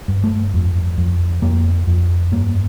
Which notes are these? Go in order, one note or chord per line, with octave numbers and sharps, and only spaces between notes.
G2
A3
F2
F2
F2 A#3
F2
G2 A#3